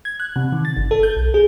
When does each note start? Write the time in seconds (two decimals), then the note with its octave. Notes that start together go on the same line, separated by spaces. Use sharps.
0.05 G#6
0.20 F#6
0.36 C3
0.52 D#3
0.65 A6
0.77 G1
0.91 A4
1.03 G6
1.16 B1
1.34 G#4